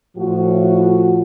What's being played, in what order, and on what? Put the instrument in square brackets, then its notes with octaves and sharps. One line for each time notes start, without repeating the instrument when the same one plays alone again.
[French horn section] A2 F3 F#4